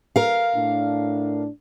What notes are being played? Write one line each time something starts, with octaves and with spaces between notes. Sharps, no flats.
A#4 F5
A2 D4